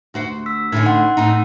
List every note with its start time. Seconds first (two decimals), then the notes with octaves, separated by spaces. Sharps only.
0.14 D2 F#4 C5
0.46 E6 B6
0.72 A2 D3 C#4 D#4
0.86 F#5 C6
1.17 A2 C4 D#4